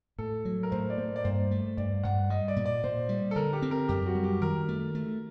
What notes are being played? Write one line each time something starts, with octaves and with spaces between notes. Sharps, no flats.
A2 A4
F#3
A#4
A2 C5
D5
A#3 C5
D5
G2 C5
A3
G2 D5
G2 F#5
G3 D#5
D5
A#2
D5
A#2 C5
G3
A4
D3 A#4
G4
C4
A#4
F#2 G4
F#4
G3
G4
D#3 A#4
A3
A3